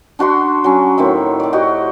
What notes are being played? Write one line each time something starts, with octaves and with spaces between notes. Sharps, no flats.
D4 F#4 B5 C6
F#3 C#4
A2 D#3 C4 E5
D5 D6
F#4 G4 D#5